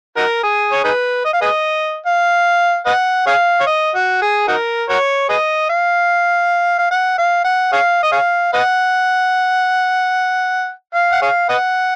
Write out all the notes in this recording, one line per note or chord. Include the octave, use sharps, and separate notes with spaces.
D#4 F#4 A#4
G#4
C#5
D#4 G#4 B4
D#5
F5
G#4 B4 D#5
F5
B4 D#5 F#5
G#4 C#5 F5
C#5
D#5
F#4
G#4
D#4 F#4 A#4
F#4 A#4 C#5
G#4 B4 D#5
F5
F5
F#5
F5
F#5
G#4 C#5 F5
D#5
G#4 C#5 F5
B4 D#5 F#5
F5
F#5
G#4 C#5 F5
B4 D#5 F#5